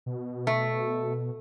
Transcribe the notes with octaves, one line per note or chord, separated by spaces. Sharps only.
B2
A3